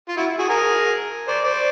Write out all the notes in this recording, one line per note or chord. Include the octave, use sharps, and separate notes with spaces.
F4
E4 F#4
F#4 G#4
G#4 A#4
C5 D5
C5 D5